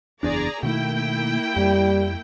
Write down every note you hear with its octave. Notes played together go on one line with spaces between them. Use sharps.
F#1 E2 D4 G#4 D5 A#5
B2 D#3 A3 A#3 E4 G5
F2 G3